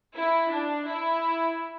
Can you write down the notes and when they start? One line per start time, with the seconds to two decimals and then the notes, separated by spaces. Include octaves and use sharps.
0.13 E4
0.49 D4
0.86 E4